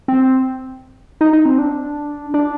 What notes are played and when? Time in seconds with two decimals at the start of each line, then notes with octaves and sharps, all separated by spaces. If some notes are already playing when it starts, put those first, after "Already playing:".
0.08 C4
1.21 D#4
1.33 D#4
1.46 C4
1.58 D4
2.34 D4